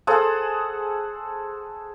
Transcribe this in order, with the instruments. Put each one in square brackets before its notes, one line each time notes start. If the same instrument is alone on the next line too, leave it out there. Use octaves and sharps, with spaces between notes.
[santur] G#4 A4 C5 F#5